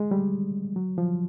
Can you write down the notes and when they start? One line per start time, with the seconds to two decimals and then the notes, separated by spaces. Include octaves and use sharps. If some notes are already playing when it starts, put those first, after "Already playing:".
Already playing: G#3
0.11 G3
0.76 F#3
0.98 F3